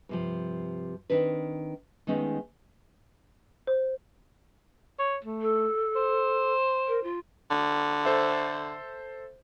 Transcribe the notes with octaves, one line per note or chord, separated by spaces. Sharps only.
G2 C3 F3
D#3 C4 D4 B4
D#3 G#3 A3 B3 C#4 D#4
C5
C#5
A3
A4
C5
A#4
F4
D3
A4 C5 E5